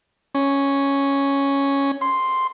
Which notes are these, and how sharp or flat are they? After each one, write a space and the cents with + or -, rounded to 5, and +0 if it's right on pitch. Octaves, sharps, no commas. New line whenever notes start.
C#4 +0
C6 +0